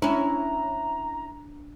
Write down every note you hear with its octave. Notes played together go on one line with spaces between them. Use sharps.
C#4 D4 E4 A#5